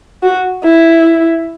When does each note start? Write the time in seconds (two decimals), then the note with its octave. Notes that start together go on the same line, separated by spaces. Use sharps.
0.23 F#4
0.64 E4